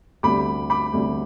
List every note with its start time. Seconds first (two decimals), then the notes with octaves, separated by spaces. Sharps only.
0.23 D2 C3 G3 B5 D6
0.70 B5 D6
0.94 D2 C3 G3